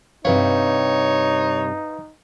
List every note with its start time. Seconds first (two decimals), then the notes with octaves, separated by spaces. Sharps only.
0.25 G2 C3 G3 D#4 B4 C#5 F5